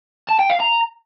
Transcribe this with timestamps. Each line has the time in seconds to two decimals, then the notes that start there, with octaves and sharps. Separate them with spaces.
0.29 A5
0.39 G5
0.50 F5
0.60 A#5